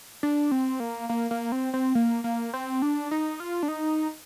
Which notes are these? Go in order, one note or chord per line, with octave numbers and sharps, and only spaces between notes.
D4
C4
A#3
A#3
A#3
C4
C4
A#3
A#3
C4
D4
D#4
F4
D4
D#4